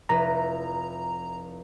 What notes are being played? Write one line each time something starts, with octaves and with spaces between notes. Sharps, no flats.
F1 E4 B4 A#5